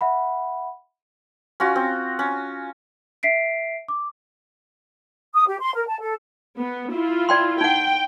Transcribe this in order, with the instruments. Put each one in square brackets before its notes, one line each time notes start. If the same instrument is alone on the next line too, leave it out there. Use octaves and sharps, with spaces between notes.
[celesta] E5 F#5 B5
[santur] C#4 F4 F#4
C4
C#4
[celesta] E5 B6 C7 D7
D6
[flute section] D#6
G4
C6
A#4
A5
A4
[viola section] B3
E4 F4
[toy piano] D5 G5 C6
[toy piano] D#4 F#5 [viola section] G5